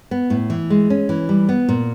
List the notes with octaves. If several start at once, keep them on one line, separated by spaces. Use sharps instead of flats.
B3
A2
E3
G#3
C#4
E3
G3
B3
A#2